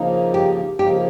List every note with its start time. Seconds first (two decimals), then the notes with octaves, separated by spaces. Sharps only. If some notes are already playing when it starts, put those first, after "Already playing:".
Already playing: C#3 F3 A#3 D#4
0.34 G4
0.79 C#3 F3 A#3 D#4 G4